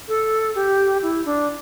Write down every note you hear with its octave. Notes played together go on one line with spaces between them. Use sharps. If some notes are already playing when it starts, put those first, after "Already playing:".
A4
G4
E4
D4